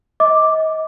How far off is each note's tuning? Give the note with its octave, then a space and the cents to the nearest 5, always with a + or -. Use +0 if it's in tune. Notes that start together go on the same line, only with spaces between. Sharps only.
D#5 +30 D6 +0